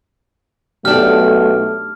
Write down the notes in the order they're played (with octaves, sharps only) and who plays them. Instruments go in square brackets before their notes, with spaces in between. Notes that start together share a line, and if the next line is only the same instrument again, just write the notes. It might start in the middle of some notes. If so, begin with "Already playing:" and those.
[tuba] B1 [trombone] A3 [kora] D4 G4 [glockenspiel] F6